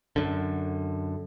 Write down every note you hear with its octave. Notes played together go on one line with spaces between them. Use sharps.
F#2 D3